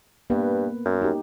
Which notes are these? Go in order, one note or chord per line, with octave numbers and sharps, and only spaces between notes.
G2 A#3 B3 B4
F#2
D#4 G4